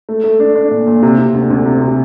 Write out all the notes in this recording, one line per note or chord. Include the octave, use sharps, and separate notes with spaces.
A3
A3
D4
D4
A#2
A#2
C3
C3
D2
D2
C3
C3